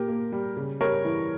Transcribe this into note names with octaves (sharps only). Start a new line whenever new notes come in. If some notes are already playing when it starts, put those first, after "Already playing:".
Already playing: A#2 G4 A#4
A#3
G3
C#3
G3 A#4 C#5
E3